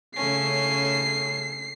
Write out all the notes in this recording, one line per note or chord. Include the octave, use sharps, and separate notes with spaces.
C#3 A3 C#4 C7